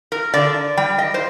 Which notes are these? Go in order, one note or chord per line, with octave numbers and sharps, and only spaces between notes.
A#4
D3 D5
G3 G5
D#5
C5